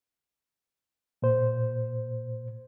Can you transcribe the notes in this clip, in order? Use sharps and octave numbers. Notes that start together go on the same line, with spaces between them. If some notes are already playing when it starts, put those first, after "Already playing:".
A#2 C5